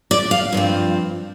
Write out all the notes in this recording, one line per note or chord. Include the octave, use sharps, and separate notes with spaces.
D5
F5
G2 F3 C4